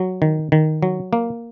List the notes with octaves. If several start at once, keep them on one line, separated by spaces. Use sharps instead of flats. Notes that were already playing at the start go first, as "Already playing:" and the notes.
Already playing: F#3
D#3
D#3
F#3
A#3